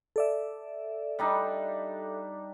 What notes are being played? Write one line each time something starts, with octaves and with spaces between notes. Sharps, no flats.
A4 D5 E5
G3 D4 D#4